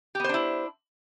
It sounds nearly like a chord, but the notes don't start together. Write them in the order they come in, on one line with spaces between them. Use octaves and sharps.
G4 B3 C5 D4 E4